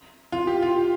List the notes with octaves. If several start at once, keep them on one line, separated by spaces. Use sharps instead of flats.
F4
G4
F4